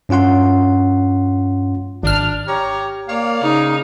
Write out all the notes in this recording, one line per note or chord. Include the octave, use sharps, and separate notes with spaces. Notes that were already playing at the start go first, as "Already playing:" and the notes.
G2 C#4 F4 F#5 C6
G#1 D4 F6
G4 C#5 A#5
A#3 C#5 D5 F5
C#3 D#4